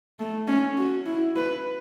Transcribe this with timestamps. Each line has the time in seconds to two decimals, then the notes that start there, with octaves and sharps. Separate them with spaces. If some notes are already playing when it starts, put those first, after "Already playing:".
0.19 A3
0.48 C#4
0.77 F#4
1.06 E4
1.36 B4